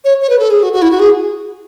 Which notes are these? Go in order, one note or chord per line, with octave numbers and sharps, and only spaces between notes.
C#5
C#5
B4
A4
G#4
F#4
F#4
E4
F#4
G#4